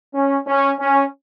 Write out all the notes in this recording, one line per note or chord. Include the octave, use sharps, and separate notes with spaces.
C#4
C#4
C#4